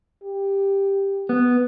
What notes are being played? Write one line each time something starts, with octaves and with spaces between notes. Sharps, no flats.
G4
B3